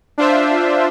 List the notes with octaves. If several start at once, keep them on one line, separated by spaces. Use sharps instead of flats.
D4 F4 C5 E5